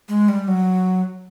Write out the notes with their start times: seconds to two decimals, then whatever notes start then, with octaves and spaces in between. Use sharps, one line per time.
0.08 G#3
0.28 G3
0.48 F#3